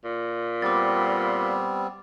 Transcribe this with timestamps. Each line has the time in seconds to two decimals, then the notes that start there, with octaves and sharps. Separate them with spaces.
0.04 A#2
0.62 G3 B3 C4 D6 A6